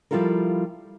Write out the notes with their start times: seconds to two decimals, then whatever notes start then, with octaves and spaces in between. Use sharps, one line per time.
0.11 F3 G3 E4 F4 A4 A#4